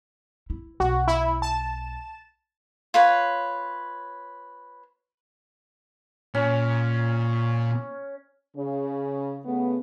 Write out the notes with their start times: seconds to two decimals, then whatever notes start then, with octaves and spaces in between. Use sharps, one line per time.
0.50 E4
0.80 B1 F#4
1.08 E4
1.42 A5 E7
2.94 F4 B4 C#5
6.35 A#2 C#4
8.56 C#3
9.45 C#3 A3 B3